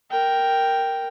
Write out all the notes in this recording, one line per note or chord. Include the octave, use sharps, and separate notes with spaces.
A#4 G5